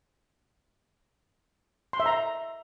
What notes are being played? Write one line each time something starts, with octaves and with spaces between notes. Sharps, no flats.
C6
E5
A#5